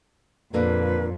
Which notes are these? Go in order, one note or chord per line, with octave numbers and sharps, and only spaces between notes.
F2 A#2 D3 A#3 B4